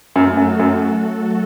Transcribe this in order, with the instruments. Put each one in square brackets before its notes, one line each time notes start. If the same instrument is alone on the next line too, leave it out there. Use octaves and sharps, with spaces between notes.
[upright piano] F#2 [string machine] F#3 A3 F#4 A4
[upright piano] F#2
F#2